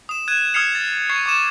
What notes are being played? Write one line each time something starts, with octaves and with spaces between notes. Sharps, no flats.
D#6 E7
F#6 G#6 D#7 E7
D#6 F6 G#6 C7 C#7 F7
A6
C#6 G#6 C7
C#6 D6 E7